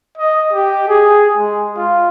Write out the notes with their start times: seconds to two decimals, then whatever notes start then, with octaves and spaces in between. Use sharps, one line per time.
0.18 D#5
0.53 G4
0.88 G#4
1.37 G#3
1.77 F4